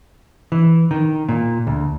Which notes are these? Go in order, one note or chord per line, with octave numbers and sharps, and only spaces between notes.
E3
D#3
A#2
D2